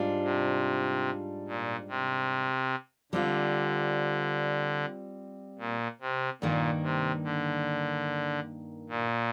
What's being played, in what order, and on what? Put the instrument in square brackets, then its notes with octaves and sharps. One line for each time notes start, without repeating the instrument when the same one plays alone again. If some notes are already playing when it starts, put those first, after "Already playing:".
Already playing: [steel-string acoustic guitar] G#2 G3 D4 F4
[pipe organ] C3
A#2
C3
[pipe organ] D3 [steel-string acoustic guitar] G3 C4 F4
[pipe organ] A#2
C3
[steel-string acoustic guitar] G2 D#3 A#3 [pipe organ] A#2
[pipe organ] C3
D3
A#2